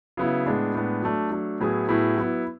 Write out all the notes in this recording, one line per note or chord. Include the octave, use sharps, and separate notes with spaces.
C#3 F#3 B3 E4
A2 G#3 B3 D4
A2 G#3 B3 D4
F#3 A3 D4
F#3 A3 D4
A2 F#3 B3 E4 G#4
A2 F#3 B3 E4 G#4
F#3 B3 E4